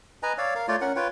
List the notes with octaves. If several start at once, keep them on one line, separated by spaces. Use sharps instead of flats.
B4 D#5 G#5 A#5
C#5 D5 F5 E6
A#4 F5
A3 F4 C#5 D5
C#4 A#4 F#5
F4 B4 C#5 G5